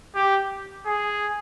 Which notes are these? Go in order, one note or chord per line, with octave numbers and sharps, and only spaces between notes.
G4
G#4